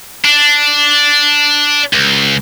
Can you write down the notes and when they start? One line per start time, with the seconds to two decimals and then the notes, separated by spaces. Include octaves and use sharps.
0.25 D4
1.93 C#2